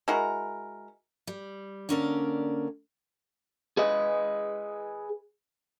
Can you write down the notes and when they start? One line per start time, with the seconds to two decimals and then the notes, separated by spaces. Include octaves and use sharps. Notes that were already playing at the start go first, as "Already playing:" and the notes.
0.08 G#3 E4 F#4 A#4
1.27 G3
1.89 D3 A#3 C#4 A4 A#4 D5
3.77 G#4 B4 D#5